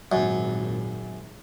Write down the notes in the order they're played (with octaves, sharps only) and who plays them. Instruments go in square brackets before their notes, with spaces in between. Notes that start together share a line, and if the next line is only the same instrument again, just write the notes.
[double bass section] G#1 A#2 [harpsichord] F#2